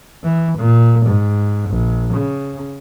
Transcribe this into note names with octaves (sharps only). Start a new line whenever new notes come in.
E3
A#2
G#2
A#1
C#3